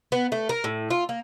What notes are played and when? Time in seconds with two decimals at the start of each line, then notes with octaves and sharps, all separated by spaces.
0.12 B3
0.32 A3
0.49 A#4
0.64 A2
0.90 F4
1.09 A#3